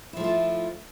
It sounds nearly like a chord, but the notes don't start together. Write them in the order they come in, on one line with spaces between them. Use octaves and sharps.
E4 F3 A3 F4